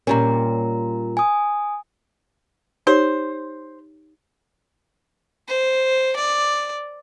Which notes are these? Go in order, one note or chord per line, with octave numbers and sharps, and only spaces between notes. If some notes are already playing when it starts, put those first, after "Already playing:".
A#2 G3 C#4 A#4 A#5
G#5 D#6
D#4 G4 C5 C#5
C5
D5